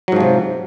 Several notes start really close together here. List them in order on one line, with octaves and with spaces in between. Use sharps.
F#3 G#2 F3 C3